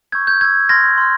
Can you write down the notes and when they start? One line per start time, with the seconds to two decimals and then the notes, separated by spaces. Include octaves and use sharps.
0.12 C#6 E6 G6 G#6
0.27 G6
0.41 C#6 E6 G6 G#6
0.69 C6 F6 G#6 A#6
0.98 C6 F6